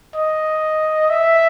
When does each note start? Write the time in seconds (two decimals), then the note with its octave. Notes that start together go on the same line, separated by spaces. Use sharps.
0.15 D#5
1.10 E5